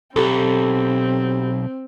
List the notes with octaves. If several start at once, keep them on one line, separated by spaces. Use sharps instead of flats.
B1 C4 G4 A4